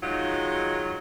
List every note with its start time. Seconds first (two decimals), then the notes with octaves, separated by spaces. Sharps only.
0.02 D#3 F#3 G#3 F4